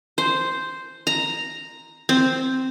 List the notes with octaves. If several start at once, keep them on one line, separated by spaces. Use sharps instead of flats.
C5
A#5
C4